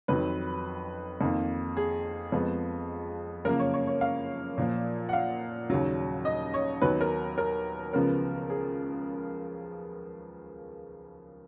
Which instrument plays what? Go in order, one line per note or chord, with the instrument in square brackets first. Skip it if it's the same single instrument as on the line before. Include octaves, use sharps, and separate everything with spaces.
[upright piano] F2 D#3 F#3 B4
F2 D#3 A#3
G#4
F2 F3 G#3 B3
F#2 C#3 F3 A#3 A#4
C#5
C#5
C#5
F5
A#2 F3 A#3
F#5
F5
D#2 C#3 F#3
D#5
C#5
D#2 D#3 F#3 B3 B4
A#4
A#4
C#2 C#3 F3 B3 A#4
G#4